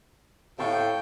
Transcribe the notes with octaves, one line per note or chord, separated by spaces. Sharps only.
A2 F5 G5 A5 C#6